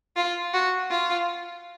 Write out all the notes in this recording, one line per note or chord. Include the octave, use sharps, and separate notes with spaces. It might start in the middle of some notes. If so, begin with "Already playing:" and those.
F4
F#4
F4